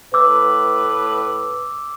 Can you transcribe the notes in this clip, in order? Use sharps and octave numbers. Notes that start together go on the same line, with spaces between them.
A2 B4 D6 E6